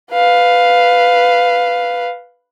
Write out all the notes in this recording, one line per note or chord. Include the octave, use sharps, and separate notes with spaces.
B4 F5